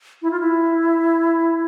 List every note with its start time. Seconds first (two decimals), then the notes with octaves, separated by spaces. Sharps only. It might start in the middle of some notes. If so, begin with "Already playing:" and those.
0.22 E4
0.31 F4
0.40 E4